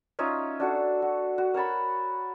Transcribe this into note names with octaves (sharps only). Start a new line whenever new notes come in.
C#4 D#4 F4 E5
D4 F#4 A4
F#4
F#4
A#4 C#5 A5 B5